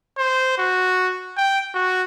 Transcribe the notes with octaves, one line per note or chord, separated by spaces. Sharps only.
C5
F#4
G5
F#4